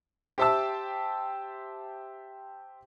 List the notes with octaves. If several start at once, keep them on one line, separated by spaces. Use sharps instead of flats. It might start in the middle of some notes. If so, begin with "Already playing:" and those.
G4 C5 E5 G5 A5 E6